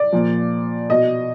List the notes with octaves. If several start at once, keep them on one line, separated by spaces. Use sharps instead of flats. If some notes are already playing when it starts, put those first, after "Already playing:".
Already playing: D5
A#2 F3
B2 D#5